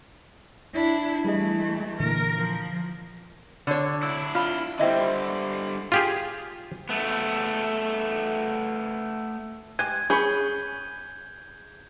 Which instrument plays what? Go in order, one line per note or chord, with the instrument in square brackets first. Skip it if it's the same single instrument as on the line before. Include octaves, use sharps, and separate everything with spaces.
[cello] D4 E4
[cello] E3 A3 [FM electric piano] G3 G#4 D#5
[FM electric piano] A#2 D3 E3 [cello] A#4
[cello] F3
[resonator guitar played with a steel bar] D3 C#5
[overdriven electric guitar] D4 E4 [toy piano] E6
[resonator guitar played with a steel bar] F4 [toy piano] F5 B5
[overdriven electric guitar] D3 G3 [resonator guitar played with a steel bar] E4 C5 [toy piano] D#5 E5 G5
[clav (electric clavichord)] F4 G4 G#4
[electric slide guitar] A3 B3
[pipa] G#3 G4 [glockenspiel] F#6 G#6 D#7
[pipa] C#4 B5 C#6 [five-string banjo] G#4 [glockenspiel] G6 G7